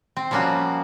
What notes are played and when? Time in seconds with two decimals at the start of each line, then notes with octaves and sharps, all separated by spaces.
0.17 C4
0.31 F3 G3 A#3 C#4 F#4